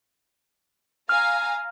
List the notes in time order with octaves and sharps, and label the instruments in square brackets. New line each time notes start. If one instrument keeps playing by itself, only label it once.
[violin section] F5 G#5 A#5 [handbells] F6